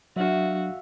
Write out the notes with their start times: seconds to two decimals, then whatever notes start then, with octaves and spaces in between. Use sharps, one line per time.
0.16 F#3 D4 F#4 E5 F5